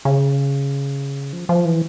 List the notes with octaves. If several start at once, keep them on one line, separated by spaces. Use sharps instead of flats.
C#3
F3
F3
E3